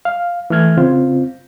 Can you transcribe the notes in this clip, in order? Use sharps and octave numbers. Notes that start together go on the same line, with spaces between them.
F5
E3 A3 F6 G#6
C#3 C4 F4